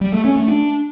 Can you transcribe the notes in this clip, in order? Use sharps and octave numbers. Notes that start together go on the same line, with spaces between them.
G3
A3
C#4
A3
D4